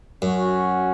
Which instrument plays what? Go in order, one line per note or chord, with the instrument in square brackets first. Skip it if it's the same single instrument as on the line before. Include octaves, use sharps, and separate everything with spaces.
[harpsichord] F#2 [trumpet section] C#4 F#4